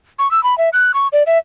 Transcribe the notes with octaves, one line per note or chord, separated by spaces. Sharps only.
C#6
E6
B5
E5
F#6
C#6
D5
E5